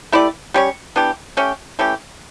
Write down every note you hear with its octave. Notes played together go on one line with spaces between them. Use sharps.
A3 E4 G4 D5
G3 C#4 G4 C#5
E3 B3 D4 G4
A3 C#4 G4
E3 A3 C#4 G4